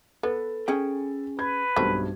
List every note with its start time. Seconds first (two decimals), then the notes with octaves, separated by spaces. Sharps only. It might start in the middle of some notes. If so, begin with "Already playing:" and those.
0.23 B3 A4 B4
0.68 C#4 G#4 G5
1.39 B4 G#6
1.76 B1 G2 A3 A#3 C4